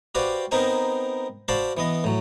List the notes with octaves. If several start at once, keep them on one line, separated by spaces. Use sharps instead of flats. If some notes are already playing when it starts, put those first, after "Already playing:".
F#4 G4 B4 C5 D5 F5
B3 C4 D#4 A#4 C5 G#5
F#4 C5 D5 F5 A5 B5
E3 B3 D#5
A2 F#3